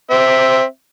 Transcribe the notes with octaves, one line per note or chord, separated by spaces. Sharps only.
C4 E5